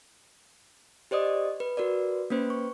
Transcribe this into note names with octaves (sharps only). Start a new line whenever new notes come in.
G4 C5 D5 D#5 D#6
B4
F#4 A#4 B4 D5
A#3 C#4 B4 C5
C#6